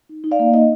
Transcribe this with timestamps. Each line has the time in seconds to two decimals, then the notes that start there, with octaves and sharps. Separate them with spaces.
0.09 D#4
0.24 D#4
0.31 D5 F5
0.39 A#3
0.54 D#4 D#5